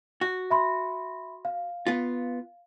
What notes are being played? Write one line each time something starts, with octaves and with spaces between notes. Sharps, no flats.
F#4
E5 B5 C6
F5
B3 F4